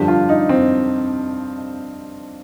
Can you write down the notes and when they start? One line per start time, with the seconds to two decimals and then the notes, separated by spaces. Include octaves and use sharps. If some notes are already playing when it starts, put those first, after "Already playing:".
Already playing: G2 D3 F3 G4
0.08 F4
0.29 D#4
0.49 C4